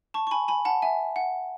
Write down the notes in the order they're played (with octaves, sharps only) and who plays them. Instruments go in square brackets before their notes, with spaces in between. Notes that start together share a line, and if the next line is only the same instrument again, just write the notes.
[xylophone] A5 C#6
C#6
G#5 B5
G#5 B5
F#5 A5
E5 G#5
F#5